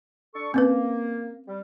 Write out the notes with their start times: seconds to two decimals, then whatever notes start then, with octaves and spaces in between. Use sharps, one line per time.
0.34 D4 A4 C#6
0.54 A#3 C4 C#4 B4
1.47 G3